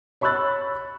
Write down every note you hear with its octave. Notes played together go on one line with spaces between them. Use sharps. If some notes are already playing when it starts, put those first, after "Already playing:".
C#5 B5 C#6 E6 F#6 A6